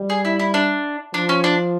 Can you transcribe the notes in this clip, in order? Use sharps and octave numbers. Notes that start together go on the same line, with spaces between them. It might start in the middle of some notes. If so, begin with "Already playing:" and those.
Already playing: G3
G#4
E4
E4
D4
F3 D4
C#4
D4